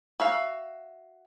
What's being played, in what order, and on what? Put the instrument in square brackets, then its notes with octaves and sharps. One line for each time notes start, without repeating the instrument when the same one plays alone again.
[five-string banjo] F#4 E5 F5